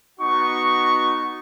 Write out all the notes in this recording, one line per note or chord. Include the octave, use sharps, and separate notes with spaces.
B3 D#4 F#4 C#6